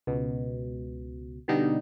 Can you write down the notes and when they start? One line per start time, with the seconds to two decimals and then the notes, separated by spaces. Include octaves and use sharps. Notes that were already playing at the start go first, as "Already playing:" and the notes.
0.07 C#2 B2
1.48 B2 D3 G3 D#4